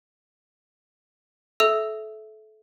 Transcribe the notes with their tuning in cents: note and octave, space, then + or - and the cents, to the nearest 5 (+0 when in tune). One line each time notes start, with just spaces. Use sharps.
A4 -30 E5 +0 E6 +0